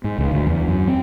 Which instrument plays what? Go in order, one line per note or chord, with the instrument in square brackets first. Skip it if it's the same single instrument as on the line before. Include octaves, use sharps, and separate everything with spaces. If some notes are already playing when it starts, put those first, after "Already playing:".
[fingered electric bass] G#2
C#2
D2
E2
F#2
C4